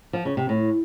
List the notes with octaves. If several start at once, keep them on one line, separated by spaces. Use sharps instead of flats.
F3
C#3
C3
A2